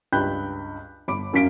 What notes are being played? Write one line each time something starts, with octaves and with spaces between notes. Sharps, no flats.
C#2 G2 G5 B5 F#6 G6
G1 B5 D6 D7
G1 F#2 C#4 F5 B6 D7